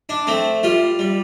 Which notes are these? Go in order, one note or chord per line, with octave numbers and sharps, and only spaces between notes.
D4
A3 C4
G3 F4
G3